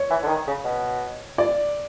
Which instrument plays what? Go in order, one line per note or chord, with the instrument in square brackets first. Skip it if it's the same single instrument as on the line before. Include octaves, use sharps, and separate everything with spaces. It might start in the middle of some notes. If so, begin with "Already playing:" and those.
Already playing: [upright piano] C#5
[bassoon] E3
D3
D#3
C#3
B2
[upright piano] D5